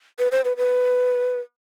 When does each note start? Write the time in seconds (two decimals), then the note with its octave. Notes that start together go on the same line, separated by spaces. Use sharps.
0.19 B4
0.32 C5
0.45 B4
0.57 B4